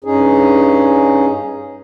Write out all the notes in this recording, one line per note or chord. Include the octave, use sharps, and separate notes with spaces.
G2 C#4 D#4 G#4